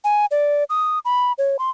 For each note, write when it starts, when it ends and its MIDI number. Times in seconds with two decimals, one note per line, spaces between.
0.04 0.26 80
0.31 0.64 74
0.70 0.99 87
1.05 1.32 83
1.38 1.57 73
1.59 1.70 84